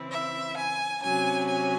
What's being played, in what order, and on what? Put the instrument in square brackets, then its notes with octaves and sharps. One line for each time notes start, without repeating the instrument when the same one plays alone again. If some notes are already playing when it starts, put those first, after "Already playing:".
Already playing: [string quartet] C#3 E3 C4 E4
E5
G#5
C3 F#3 C#4 G#5
G#5